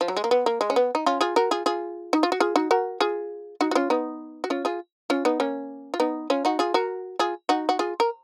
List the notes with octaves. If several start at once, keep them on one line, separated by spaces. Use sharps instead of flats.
F3
F#3
G#3
A#3
B3
A#3
G#3
C#4
B3
D#4
C#4 F4
F4 G#4
F#4 A#4
F4 G#4
F4 G#4
D#4
F4
F#4
F4 G#4
D#4 F#4
F#4 A#4
F4 G#4
D#4 F#4
F#4
C#4 F4
B3 D#4
F#4
C#4 F4
F4 G#4
C#4 F4
B3 D#4
A#3 C#4
F4
B3 D#4
C#4 F4
D#4 F#4
F4 G#4
F#4 A#4
F4 G#4
D#4 F#4
F#4
F4 G#4
A#4